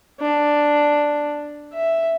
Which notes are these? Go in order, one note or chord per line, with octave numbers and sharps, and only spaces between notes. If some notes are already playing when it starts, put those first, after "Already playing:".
D4
E5